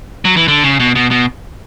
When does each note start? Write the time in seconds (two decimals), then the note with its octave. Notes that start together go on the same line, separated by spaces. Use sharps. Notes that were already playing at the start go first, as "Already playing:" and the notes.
0.25 F#3
0.37 E3
0.48 D3
0.64 C#3
0.80 B2
0.96 B2
1.11 B2